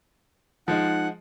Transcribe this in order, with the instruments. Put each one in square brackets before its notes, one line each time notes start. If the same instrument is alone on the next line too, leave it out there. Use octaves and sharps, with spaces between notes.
[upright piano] F3 G#3 [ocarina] D#4 [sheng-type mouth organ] F#5